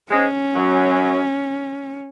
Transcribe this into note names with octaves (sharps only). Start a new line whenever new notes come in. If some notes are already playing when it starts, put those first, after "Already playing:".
G#2 G#3 C#4
F#2 F#3